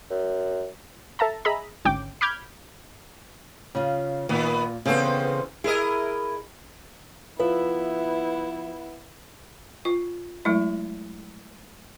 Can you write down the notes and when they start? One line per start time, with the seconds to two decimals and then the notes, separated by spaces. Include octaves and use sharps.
0.10 F#2
1.19 A4 E5 A5 A#5
1.45 G#4 D#5 E5 A#5 B5
1.85 G#1 D2 C#4 G5 D6
2.21 B5 D6 F6 G6 G#6
3.75 C#3 F4
4.29 A#2 D#3 B3
4.86 E2 C#3 B3 C4 A4
5.64 E4 G#4 A#4 D#5
7.39 F3 B3 E4 B4 E5
9.85 F4
10.45 F#3 G#3 A3 E4